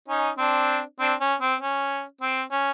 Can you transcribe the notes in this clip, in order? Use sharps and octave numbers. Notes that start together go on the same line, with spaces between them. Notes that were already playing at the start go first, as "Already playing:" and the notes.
C#4 D#4
C4 D4
C4 D4
C#4
C4
C#4
C4
C#4